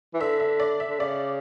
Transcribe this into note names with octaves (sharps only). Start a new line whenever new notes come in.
E3
D3 E5
E5
D5
E5
D3
C#3 D5